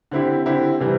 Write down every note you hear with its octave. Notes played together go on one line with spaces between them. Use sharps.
D3 C4 E4 G4
D3 C4 E4 G4
C3 E3 G3